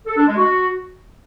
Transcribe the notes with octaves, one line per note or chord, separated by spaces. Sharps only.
A4
D4
G#3
F#4